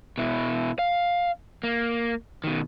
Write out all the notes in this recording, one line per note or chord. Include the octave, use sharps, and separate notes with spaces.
B2 E4
F5
A#3
B2 D#3